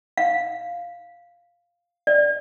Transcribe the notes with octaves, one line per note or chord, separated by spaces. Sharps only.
F5
D5